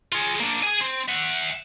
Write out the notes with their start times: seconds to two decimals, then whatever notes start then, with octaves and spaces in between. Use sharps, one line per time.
0.12 F4 G#4
0.40 A#3 D4
0.63 G#4 G#5
0.81 C4
1.08 E5 F#5